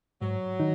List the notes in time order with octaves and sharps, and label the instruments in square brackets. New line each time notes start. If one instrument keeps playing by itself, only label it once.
[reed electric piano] G#2 [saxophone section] F#3
[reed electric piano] D#3 D#4